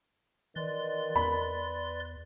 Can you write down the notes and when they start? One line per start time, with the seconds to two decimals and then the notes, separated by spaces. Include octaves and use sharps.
0.56 D#3 E3 B4 D5 C6
1.16 E2 B5